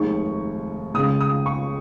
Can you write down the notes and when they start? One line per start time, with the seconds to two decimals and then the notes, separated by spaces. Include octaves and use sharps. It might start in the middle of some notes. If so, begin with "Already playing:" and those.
Already playing: F1 D#2 D#3 G#3 C#6
0.94 C#2 C#3 G#3 D#6
1.21 D#6
1.46 C#6